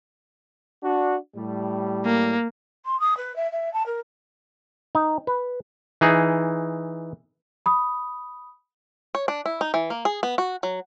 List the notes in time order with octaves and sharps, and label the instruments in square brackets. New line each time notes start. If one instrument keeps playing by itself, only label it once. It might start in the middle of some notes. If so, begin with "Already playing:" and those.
[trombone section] D4 F#4
A2 G3
[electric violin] A#3
[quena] C6
D#6
B4
E5
E5
A5
A#4
[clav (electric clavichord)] D#4
B4
E3 D#4 G#4
[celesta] B5 D#6
[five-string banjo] C#5
D4
E4
D#4
E3
A#3
G#4
B3
F#4
F#3